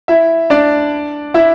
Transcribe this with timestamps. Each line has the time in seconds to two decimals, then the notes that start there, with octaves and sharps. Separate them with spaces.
0.08 E4 E5
0.50 D4 D5
1.34 E4 E5